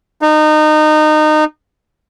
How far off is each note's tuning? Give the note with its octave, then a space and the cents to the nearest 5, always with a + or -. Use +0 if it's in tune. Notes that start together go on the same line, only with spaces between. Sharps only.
D#4 -25